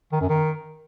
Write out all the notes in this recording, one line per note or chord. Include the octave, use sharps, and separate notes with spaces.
D#3
F#2
D#3